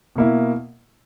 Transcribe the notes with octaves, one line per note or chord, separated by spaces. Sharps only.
B2 A#3 E4